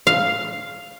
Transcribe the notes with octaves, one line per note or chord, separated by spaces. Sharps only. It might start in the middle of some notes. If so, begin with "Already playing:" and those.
F5